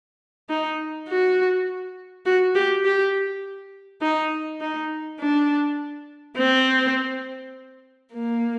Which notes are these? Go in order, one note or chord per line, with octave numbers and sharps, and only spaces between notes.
D#4
F#4
F#4
G4
G4
D#4
D#4
D4
C4
A#3